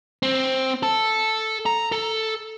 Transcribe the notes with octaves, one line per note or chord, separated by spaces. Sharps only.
C4
A4
A#5
A4